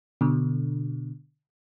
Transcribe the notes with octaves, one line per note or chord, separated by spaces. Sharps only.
B2 D3